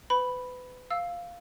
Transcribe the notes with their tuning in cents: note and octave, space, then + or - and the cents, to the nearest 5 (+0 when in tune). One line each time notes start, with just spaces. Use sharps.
B4 +30 B5 +0
F5 +0 E6 +0